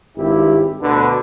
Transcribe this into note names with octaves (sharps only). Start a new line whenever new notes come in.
G#1 G2 E4 G4
D2 B2 D3 D4 B4